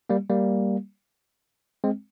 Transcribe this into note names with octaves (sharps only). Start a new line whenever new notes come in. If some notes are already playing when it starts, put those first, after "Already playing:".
G3 A#3
G3 A#3
G#3 C4